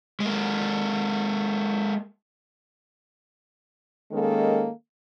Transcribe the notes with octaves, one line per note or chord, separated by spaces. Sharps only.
G#3 A#3
D#3 G#3 A#3 C#4 A4